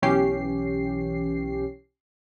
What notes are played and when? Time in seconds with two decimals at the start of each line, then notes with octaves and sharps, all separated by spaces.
0.02 B1 E3 C#4 G4 C7